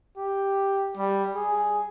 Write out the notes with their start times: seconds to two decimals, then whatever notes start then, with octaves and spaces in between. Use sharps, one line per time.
0.17 G4
0.97 G3
1.35 G#4